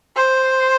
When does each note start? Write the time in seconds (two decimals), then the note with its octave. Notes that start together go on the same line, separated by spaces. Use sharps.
0.16 C5